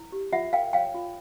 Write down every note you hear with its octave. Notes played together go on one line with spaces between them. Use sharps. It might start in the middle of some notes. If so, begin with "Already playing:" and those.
Already playing: E4
G4
F4 E5 F#5
A#4 F5 G5
C#5 F5 G5
F4